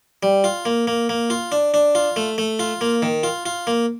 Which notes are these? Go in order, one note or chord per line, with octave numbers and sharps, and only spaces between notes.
G3
F4
A#3
A#3
A#3
F4
D4
D4
F4
A3
A3
F4
A#3
D#3
F4
F4
A#3